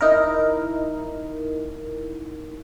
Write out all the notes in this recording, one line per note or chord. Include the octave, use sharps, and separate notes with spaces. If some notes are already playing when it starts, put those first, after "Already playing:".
D#4 E4 A#4